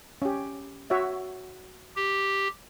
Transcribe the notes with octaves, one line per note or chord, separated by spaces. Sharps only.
C#4 G4
F#4 C#5 E5
G4